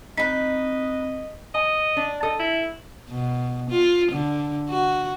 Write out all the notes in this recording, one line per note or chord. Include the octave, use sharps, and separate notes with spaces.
C4 D#4 B4 D#5 B6
D#5 G#5
D4
A4 D#5
E4
B2
F4
D3
F#4